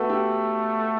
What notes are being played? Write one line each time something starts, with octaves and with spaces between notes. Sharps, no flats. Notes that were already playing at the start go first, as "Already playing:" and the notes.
Already playing: A3 B3 F#4 A4 B4
G4